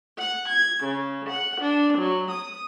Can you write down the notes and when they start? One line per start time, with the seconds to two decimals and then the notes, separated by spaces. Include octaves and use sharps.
0.18 F#5
0.48 G#6
0.83 C#3
1.28 F#5
1.59 D4
1.97 F#3
2.29 D#6